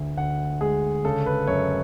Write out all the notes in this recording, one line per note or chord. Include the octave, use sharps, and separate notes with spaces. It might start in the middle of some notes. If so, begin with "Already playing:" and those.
Already playing: D2 D3
D2 F#5
G#3 G#4
C#3 A4
B4
F#2 C#5